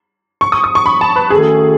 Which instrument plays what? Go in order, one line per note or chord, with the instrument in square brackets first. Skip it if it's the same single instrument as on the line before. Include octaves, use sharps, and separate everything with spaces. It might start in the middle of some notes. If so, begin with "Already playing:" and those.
[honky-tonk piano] C#6
D#6
D#6
C#6
B5
A5
B4
[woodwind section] D#3 A3 C#4 F#4 A4 [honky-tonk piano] G#4